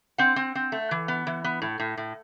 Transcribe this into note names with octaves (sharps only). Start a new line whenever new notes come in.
C4 F#5
C4
C4
A3
E3
B3
E3
B3
A2
A2
A2